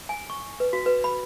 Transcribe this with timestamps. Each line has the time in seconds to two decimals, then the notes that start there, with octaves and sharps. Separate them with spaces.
0.09 G#5
0.30 C#6
0.60 B4
0.73 F#4
0.86 B4
1.04 B5